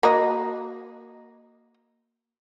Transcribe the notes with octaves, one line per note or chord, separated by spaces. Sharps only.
A#3 F#4 D#5